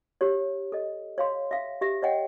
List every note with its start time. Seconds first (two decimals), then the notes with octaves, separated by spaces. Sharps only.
0.21 G4 C#5
0.72 A4 D#5
1.18 C#5 F5 C6
1.51 E5 F5
1.81 G4 E5
2.02 C#5 D#5 F#5 G5